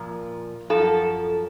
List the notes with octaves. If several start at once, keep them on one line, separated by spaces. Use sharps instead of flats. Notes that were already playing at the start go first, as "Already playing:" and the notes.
Already playing: A#2 F3
F#2 F3 A4